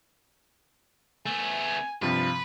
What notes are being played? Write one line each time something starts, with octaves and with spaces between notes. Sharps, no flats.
A3 B3 G#5
G2 C3 F3 F4 B4